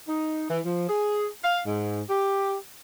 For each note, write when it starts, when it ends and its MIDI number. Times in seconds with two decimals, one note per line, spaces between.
0.08 0.46 63
0.50 0.60 52
0.65 0.85 53
0.89 1.27 68
1.44 1.61 77
1.67 2.01 44
2.10 2.57 67